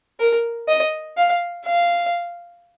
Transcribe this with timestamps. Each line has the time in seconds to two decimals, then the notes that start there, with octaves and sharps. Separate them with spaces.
0.20 A#4
0.68 D#5
1.17 F5
1.65 F5